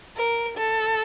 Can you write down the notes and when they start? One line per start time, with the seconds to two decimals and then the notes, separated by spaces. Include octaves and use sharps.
0.16 A#4
0.57 A4